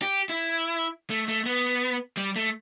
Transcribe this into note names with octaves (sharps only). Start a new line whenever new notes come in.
G4
E4
A3
A3
B3
G3
A3